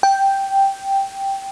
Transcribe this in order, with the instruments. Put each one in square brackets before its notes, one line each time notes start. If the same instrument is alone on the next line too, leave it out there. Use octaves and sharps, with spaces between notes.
[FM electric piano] G5